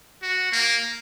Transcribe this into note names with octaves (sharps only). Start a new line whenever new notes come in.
F#4
A#3